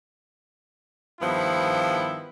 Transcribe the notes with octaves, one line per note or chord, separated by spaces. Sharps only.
G2 D#3 F3 B3 E4